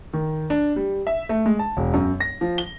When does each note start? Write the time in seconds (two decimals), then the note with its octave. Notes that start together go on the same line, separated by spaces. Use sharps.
0.13 D#3
0.50 D4
0.76 G3
1.07 E5
1.29 A3
1.46 G#3
1.59 A5
1.77 E1
1.94 F#2
2.20 A#6
2.41 F3
2.58 G7